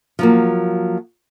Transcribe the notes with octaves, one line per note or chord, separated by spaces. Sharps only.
F3 F#3 A#3